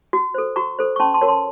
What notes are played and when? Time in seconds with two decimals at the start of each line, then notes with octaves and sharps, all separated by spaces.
0.13 F#4
0.34 A4 C5
0.56 F#4 A#5 C#6
0.79 A4 C5
0.96 C#6
1.00 C#4 A5 C6
1.14 A5 C6
1.21 F#4 A#4 C#5
1.28 A5 C6